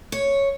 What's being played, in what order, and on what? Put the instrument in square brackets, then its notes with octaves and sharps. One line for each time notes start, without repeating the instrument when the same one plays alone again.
[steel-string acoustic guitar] C#5